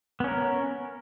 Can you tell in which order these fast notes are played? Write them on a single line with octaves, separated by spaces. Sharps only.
B3 C#4 A#4